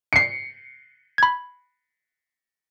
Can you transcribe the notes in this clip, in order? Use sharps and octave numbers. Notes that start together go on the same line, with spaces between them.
C7 C#7
B5 G#6